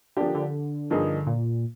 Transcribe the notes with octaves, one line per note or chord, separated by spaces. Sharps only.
D3 F3 A#3 D4 G4
D3
G2 F3 A#3 D#4 G#4
A#2